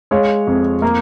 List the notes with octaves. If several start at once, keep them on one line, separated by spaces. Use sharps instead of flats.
G#3 C#5 F5
F2
A#3